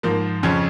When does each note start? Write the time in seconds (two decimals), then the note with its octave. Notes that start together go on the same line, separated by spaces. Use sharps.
0.03 G#2 F3 A#3
0.43 F2 C#3 F3 C#4